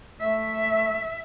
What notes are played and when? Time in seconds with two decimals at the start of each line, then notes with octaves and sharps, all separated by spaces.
0.20 A3 E5